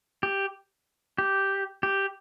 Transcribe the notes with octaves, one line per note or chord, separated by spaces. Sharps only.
G4
G4
G4